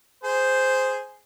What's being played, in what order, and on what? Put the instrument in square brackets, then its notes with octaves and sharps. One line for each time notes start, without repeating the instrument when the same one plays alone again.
[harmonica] G#4 C5